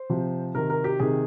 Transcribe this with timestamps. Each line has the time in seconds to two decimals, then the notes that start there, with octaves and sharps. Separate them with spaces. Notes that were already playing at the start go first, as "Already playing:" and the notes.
Already playing: C5
0.10 C3 F3
0.55 C3 D#3 A#4
0.70 A#4
0.84 G4
1.00 C3 D#3 G#4